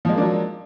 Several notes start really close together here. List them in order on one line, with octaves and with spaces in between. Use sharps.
F3 G#3 A#3 D4 F#3